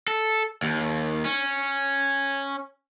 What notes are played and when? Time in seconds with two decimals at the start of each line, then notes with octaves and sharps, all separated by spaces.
0.08 A4
0.63 D#2
1.25 C#4